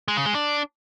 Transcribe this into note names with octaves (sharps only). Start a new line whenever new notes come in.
G#3
C#3
G#3
D4